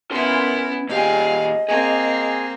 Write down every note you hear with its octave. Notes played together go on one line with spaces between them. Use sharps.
B3 C#4 E4 A#4 C6
A#2 G4 G#4 D#5 F5
A#3 C4 G#4